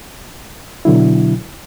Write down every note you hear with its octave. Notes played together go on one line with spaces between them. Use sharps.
B2 D3 F#3 E4